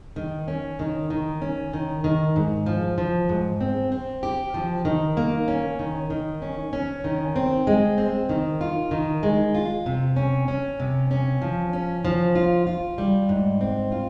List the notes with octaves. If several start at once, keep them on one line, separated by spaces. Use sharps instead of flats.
D#3
C#4
D#3
D#3
C#4
D#3
D#3
G#2
F3
F3
G#2
C4
C4
G4
F3
D#3
A#3
C#4
D#3
D#3
C#4
C#4
D#3
C4
G#3
C4
D#3
F4
D#3
G#3
F4
C3
C#4
C#4
C3
C#4
F3
C#4
F3
F4
F4
G3
G#2
C4
F4